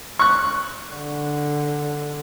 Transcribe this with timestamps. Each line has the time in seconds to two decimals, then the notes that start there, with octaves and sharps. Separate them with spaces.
0.19 C#6 F#6
0.96 D3